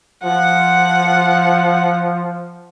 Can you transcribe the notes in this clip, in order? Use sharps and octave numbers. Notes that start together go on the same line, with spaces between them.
F3 F#5